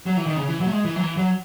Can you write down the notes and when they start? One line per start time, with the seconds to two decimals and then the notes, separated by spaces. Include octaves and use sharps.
0.06 F#3
0.17 E3
0.26 D#3
0.36 C#3
0.48 E3
0.60 F#3
0.67 A3
0.72 G#3
0.85 E3
0.96 F#3
1.01 E3
1.17 F#3